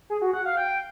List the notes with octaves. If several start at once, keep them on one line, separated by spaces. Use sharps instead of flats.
G#4
F#4
F#5
F5
G5